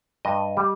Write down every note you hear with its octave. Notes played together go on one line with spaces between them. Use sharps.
G2 D#5
G3